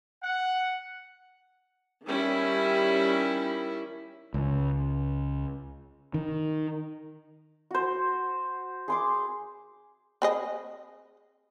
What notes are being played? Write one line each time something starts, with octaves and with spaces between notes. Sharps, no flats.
F#5
D#3 G3 C#4 E4
C#2
D#3
F#4 C5
G#4 C6 D6
C4 G#4 D#5